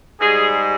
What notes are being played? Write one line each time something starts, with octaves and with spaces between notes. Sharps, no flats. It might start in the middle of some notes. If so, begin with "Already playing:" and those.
G#2 G3 G#4